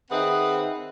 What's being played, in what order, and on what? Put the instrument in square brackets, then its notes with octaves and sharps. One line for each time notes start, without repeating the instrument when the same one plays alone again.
[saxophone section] D#3 C4 G#4 B4 E5 F#5